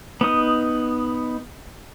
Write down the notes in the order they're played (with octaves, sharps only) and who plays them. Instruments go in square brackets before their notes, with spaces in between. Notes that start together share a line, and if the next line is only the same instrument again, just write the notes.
[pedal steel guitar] B3 D#4 D#6